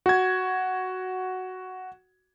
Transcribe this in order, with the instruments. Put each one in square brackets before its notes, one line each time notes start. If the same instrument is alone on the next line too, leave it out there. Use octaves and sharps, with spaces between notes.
[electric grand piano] F#4 G#6